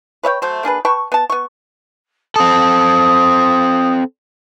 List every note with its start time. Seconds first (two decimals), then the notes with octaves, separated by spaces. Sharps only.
0.23 B4 C#5 E5 G5
0.42 F#3 A3 C5
0.63 A#3 D4 G#4 B4
0.85 B4 G5 A5 C#6
1.12 B3 A5
1.30 B3 C#6
2.36 C4 A4 D#6